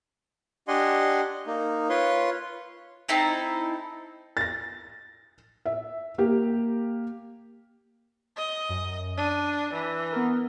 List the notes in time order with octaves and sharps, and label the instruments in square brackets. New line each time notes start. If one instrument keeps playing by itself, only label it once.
[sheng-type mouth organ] D4 G4 D#5 F#5 G#5 C6
A#3 D#4
F4 B4 C#5 C6
[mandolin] C4 D#4 E4 A4
[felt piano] A6 A#6
E5
A#3 G4
[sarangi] D#5
[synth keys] F#2
[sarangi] D4 [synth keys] D#7
[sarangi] E3
[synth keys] B3 A#4